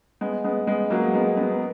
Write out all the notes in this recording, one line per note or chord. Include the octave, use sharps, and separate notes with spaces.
G#3 B3
G#3 B3
G#3 B3
F#3 A#3
G#3 B3
G#3 B3
B3